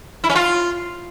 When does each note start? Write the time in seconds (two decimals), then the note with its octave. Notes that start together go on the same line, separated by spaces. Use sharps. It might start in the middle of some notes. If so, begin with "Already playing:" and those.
0.24 E4
0.30 C#4
0.35 F4